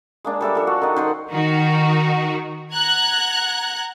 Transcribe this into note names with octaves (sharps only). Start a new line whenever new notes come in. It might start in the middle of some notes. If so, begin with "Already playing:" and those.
G#3 A#3 D4
G3 A4 E5 D6
F3 A4
F#4
D#3 D#4
D#3 C5 F#5
D#3 D#4 F#4
F#5 A#5 F#6 G#6